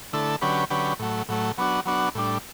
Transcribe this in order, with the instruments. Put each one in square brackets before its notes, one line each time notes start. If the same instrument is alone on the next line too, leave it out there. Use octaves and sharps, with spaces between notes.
[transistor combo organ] D3 A3 E4 A4
D3 F#3 C#4 G4 B4
D3 F#3 C#4 G4 B4
A2 F#3 A3
A2 F#3 A3
F#3 B3 D4 F#4
F#3 B3 D4 F#4
A2 G3 D4